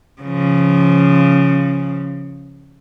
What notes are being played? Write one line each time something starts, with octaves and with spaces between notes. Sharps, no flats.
C#3 F3